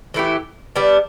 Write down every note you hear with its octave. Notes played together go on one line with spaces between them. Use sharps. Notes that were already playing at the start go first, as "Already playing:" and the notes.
E3 A3 E4 G4
G3 B3 D4